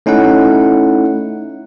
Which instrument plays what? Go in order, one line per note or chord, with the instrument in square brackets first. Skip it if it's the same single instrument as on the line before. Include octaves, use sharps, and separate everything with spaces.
[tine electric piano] A3 C#4 D#4 E4 F#5